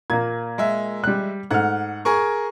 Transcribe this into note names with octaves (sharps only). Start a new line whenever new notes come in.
A#2 A#3 G#6
G#3 E5
G3 F#6
G#2 A3 F#5 F6
G#4 A#4 C#6